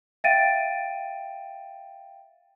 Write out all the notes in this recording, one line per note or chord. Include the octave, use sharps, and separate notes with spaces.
E5 F5 G5 A6 D7 D#7